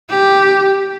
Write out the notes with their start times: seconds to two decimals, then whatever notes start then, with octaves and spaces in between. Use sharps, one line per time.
0.10 G4